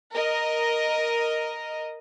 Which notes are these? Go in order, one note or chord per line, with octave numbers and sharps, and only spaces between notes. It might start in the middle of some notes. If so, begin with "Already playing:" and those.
A#4 D#5